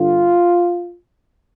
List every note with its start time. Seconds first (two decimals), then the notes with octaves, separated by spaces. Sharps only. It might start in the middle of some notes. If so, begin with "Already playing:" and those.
Already playing: G2 D3 F4